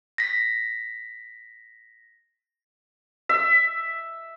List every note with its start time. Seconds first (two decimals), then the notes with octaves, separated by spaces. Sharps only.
0.18 A#6 B6
3.29 E5